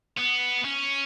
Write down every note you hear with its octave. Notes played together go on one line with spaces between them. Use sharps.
B3
C#4